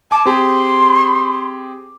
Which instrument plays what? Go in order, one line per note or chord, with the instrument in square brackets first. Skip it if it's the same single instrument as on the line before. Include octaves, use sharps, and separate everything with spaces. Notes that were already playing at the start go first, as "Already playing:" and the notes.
[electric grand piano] G#5 D6 [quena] A5
[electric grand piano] C4 G4 G#4 [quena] C6